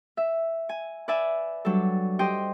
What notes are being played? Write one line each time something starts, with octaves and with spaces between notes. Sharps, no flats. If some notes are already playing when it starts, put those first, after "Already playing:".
E5
G#5
B4 D5 E5 G#5
F#3 G3 D4 A4
G4 C5 D#5 G5